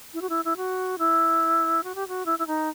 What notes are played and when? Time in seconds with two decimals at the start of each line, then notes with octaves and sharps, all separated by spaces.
0.14 E4
0.21 F#4
0.30 E4
0.45 E4
0.57 F#4
0.99 E4
1.84 F#4
1.95 G4
2.08 F#4
2.26 E4
2.39 E4
2.47 D#4